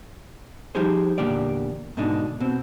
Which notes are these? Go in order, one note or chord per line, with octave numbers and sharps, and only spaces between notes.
F3 G3 D#4 G4 G#4 C5
E2 A#2 D3 A#3 G4 D5
G#2 B2 D3 D4 D#4
B2 C4